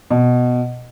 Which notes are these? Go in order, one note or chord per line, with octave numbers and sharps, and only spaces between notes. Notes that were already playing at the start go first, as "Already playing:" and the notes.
B2